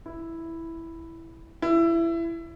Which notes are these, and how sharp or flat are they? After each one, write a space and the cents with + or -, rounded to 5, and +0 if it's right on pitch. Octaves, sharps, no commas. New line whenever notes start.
E4 +0
E4 +20